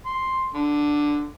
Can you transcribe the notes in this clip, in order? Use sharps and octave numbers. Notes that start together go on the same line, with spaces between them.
C6
D3